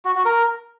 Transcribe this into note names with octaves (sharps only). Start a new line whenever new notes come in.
F#4
F#4
A#4